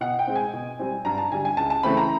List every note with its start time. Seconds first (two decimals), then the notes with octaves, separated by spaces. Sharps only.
0.01 B2 F#5
0.19 G5
0.27 G#3 C4
0.35 G#5
0.53 B2
0.79 G3 C4
1.05 G2 A#5
1.18 A5
1.31 D3 G3 G#5
1.45 G#5
1.57 C#2 A5
1.70 A5
1.83 C#3 E3 A3 C4 B5
1.97 A#5